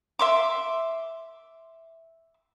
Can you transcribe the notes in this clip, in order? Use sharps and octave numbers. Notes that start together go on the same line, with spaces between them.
E5 C6 D6